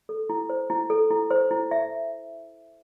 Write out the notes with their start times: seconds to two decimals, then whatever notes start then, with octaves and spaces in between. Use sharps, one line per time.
0.09 A4
0.29 E4
0.50 C5
0.70 E4
0.90 A4
1.10 E4
1.31 C5
1.51 E4
1.71 E5